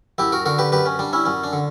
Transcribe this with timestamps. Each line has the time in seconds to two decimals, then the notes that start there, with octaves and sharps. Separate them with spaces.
0.18 F#2 E4 G4
0.32 F#4 A#4
0.45 D3 F#4 A#4
0.59 G4 B4
0.72 F#2 G4 B4
0.86 C#4
0.99 G3 D4
1.13 C#4 E4
1.25 F#2 C#4
1.44 D4
1.53 D3